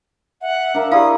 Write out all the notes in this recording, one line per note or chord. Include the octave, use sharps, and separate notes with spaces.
E5 F#5
D4 A#4 E5 F5
E4 G4 A#4 D5 F5 D#6